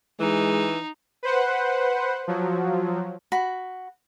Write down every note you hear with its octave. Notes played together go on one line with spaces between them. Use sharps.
E3 G#3 D#4
B4 C5 F#5
F3 F#3
F#4 B5